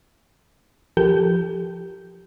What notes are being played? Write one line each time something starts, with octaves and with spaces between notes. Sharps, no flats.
F3 G4 A4 A#4 G6